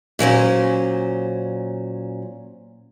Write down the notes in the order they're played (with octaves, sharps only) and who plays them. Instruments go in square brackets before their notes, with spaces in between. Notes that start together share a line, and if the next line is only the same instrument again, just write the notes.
[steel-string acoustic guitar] A#2 F#3 C#4 C5